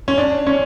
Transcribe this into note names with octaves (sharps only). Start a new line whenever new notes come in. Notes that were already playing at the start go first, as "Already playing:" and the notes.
C#4
D4
C#4